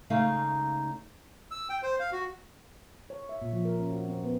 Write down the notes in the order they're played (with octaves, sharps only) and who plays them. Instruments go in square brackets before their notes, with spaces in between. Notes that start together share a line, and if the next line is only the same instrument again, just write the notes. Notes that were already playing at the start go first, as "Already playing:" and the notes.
[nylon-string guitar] C#3 G#3 A3 D#4 F5
[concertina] E6
G5
C5
F5
F#4
[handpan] C#5
E5
A#2
F3
A#4
C#4
F#4
C4
B3